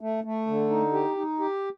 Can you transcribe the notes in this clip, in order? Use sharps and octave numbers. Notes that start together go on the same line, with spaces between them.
A3
A3
D3
D#4
G4
D#4
G4